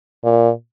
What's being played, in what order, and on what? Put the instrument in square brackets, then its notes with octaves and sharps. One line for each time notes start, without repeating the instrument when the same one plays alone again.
[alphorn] A#2